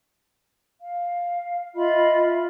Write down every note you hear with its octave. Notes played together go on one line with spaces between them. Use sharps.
F5
F4 D#5 E5 B5